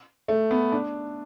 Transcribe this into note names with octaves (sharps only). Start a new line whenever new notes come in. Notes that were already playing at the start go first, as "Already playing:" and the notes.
A3
B3
D4